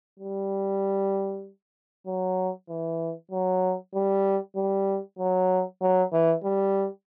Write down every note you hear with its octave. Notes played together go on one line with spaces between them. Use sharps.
G3
F#3
E3
F#3
G3
G3
F#3
F#3
E3
G3